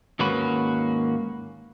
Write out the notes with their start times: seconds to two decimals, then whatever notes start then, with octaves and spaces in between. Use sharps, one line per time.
0.19 D#2 G#2 A#3 C#4 F#4 B4